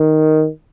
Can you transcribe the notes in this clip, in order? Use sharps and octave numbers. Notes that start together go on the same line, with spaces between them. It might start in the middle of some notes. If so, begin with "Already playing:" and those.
Already playing: D#3